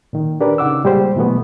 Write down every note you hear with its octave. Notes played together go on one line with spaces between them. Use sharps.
A#2 D#3
D4 G4 A#4 B4 D5
C#3 D#4 F#5 D6 E6
A#2 G3 G#3 G4 C5
B2 E3 F#3 A3 B3